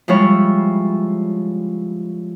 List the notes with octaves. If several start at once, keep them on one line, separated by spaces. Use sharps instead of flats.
F3 G3 G#3 E4 C#5